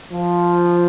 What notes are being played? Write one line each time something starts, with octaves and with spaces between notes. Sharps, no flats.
F3